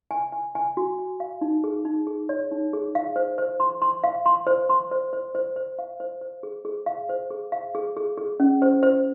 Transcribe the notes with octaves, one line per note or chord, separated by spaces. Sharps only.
G#5
G#5
G#5
F#4
G#5
F5
D#4
G#4
D#4
G#4
C#5
D#4
G#4
F5
C5
C5
C6
C6
F5
C6
C5
C6
C5
C5
C5
C5
F5
C5
C5
G#4
G#4
F5
C5
G#4
F5
G#4
G#4
G#4
C#4
C5
C5